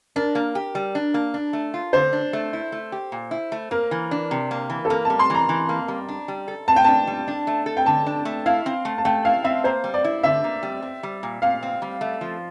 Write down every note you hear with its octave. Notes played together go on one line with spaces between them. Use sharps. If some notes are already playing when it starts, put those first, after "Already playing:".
D4 A#4
A#3
G4
G3
D4
A#3
D4
A3
F4
D3 C5
D4
A3
E4
A3
G4
A#2
E4
A3
A#3 A#4
E3
D4
C3
A#3
E3
A4
A#3 A#4
G3 A5
C6
E3 A#5
E3
A#3
G3
D4
G3
A4
A2 A5
G5
D4 A5
G3
D4
A3
A4
G5
D3 A5
D4
A3
E4 F5
C4
A3
A5
A3 G5
E4 F5
C4 E5
A#3 C5
G3
D5
E4
D3 E5
A#3
G3
C4
G3
A#2
A#2 F5
C4
G3
A3
F3